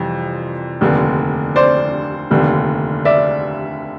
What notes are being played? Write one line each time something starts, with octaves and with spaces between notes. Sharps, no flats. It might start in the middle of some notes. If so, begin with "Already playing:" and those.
Already playing: F2 C3 E3 G3
F1 D#2 D3
C5 D5
F1 D#2 D3
D5 E5